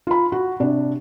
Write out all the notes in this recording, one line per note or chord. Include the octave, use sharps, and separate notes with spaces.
F4 B5
F#4
C3 D4